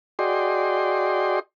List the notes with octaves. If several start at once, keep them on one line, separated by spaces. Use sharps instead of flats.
F#4 G#4 D5 D#5 G5 C6